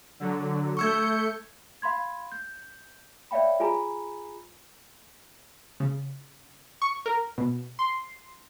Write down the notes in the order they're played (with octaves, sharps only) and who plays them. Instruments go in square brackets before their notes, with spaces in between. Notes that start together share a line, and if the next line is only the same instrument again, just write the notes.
[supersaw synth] D3 F#3
[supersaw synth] A3 G6 C#7 [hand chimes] C#6 E6 G#6
[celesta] F5 B5 C6 G#6
G6
C#5 D5 E5 F5 G5 B5
F4 G#4 G#5 A#5 B5
[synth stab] C#3
C#6
A#4
B2
C6